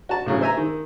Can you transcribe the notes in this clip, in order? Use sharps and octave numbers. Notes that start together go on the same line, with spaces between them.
F#4 A5
A2 C#3 F#3
C5 E5 G#5 A#5
D#3